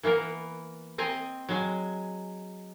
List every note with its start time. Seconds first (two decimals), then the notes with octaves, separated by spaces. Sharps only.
0.03 E3 A#3 B3 A#4
0.98 C4 D#5 G#5 A#5
1.49 F#3 G#3 G#5